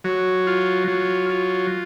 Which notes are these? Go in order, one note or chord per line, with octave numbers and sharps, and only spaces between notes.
F#3
F4
F#3
F4